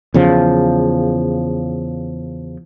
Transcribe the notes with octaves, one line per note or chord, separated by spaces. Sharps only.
E2 C#3 F3